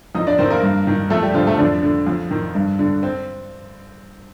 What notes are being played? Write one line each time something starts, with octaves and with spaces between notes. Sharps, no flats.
F2 D#4 D#5
D4 D5
D#3 C4 C5
A#3 A#4
G2
D#3
F2 A3 A4
G3 G4
D3 F3 F4
A3 A4
F2 D3 D4
D3
F2
D#3
G2
D3
C4